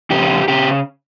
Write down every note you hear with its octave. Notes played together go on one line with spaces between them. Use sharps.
F2 C#3 G4
C#3 G4